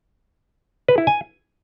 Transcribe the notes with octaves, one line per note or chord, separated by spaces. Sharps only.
B4
E4
G#5